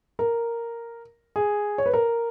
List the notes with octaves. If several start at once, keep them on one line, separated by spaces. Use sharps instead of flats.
A#4
G#4
C#5
B4
A#4